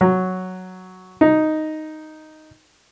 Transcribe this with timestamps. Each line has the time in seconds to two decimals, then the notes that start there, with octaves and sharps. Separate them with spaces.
0.01 F#3
1.21 D#4